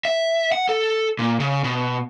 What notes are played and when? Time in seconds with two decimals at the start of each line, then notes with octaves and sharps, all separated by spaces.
0.05 E5
0.52 F#5
0.69 A4
1.19 A#2
1.40 C#3
1.64 B2